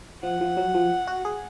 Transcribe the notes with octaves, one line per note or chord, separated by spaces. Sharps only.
F3 F#5
F3
F#3
F3
F#4
G#4